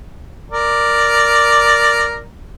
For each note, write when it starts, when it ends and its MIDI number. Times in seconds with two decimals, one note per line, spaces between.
0.50 2.24 70
0.50 2.24 74